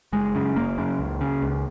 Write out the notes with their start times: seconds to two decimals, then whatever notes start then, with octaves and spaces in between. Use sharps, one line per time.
0.13 F#1 G#3
0.35 F#2 C#3
0.56 F#1 A#3
0.78 F#2 C#3
0.99 C#2
1.21 C#3
1.42 C#2